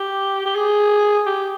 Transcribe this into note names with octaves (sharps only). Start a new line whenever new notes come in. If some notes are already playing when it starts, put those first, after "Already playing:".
Already playing: G4
G4
G#4
G4